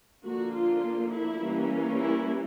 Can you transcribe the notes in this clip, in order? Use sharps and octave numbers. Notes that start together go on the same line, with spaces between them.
D3 F3 A#3 F#4
F4
E4
E3 G3 A#3 C#4
E4